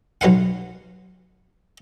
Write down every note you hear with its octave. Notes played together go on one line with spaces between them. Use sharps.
B1 F#3 B4 F5 F#5